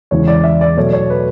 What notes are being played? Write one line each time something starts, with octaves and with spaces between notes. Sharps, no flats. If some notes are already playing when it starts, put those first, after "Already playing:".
E2 C#3 E3 G#3 C#5
D5
E5
D5
B2 F#3 A3 C#5
C#5
B4